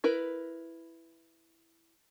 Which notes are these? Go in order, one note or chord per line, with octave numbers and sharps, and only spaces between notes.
E4 A#4 B4